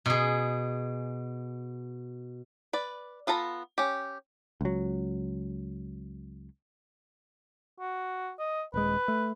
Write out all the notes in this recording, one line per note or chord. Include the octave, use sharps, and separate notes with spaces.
B2 G#4
B4 D5
B3 F4 A4 A#5 B5
C#4 G4
C#2 F#3
F#4
D#5
D#1 G#3 B4
A3